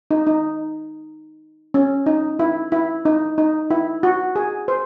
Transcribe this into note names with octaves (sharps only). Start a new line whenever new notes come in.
D#4
D#4
C#4
D#4
E4
E4
D#4
D#4
E4
F#4
G#4
C5